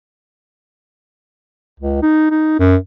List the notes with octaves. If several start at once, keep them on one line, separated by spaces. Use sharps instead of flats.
C#2
D#4
D#4
F#2